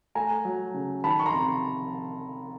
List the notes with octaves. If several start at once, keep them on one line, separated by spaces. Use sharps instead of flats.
A3 G#5 A#5
F#3
C#3
D#3 A5 B5
C#6
A#5 C6
C3